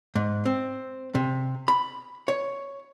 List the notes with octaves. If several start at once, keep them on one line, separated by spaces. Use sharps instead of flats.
G#2
C4
C3
B5
C#5